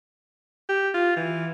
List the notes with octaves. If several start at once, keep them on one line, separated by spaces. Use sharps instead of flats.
G4
F4
E3